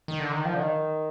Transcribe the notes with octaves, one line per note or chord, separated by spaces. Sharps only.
D#3
D3
D#3
F3
D3
D#3